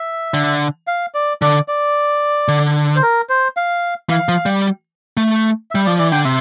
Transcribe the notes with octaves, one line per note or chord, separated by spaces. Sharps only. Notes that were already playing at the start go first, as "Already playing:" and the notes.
Already playing: E5
D3
F5
D5
D3 D5
D5
D3
C5
A#4
C5
F5
E3 F5
F3
G3
A3
G3 E5
F3 D5
E3 D5
D3 G5
C3 E5